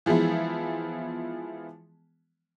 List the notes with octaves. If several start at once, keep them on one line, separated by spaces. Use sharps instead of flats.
E3 F3 G#3 B3 E4